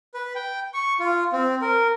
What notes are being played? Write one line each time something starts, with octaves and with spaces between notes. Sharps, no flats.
B4
G5
C#6
F4
C4
A#4